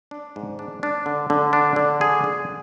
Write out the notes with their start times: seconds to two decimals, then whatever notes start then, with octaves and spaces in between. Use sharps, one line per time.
0.11 D4
0.36 G#2
0.59 D4
0.83 D4
1.06 D3
1.30 D3
1.53 D4
1.76 D3
2.01 G#4
2.24 G#4